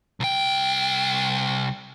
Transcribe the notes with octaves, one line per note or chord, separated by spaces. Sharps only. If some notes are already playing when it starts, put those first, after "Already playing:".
C2 G5